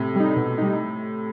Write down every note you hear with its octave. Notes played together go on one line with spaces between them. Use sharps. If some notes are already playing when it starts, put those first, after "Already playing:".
Already playing: A2 C3
G3 D#4
B2
G3 D#4